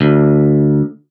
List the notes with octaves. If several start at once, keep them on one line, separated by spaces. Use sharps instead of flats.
D2